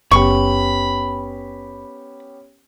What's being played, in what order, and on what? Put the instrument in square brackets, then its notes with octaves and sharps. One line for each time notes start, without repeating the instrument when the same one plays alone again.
[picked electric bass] F#1 [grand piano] B3 C#4 G4 [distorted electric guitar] B5 [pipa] C#6